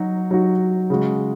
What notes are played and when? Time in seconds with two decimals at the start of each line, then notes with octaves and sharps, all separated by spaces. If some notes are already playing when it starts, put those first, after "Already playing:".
Already playing: F#3 D#4 F#4
0.31 F#3 D#4 F#4
0.90 C#3 G#3 F#4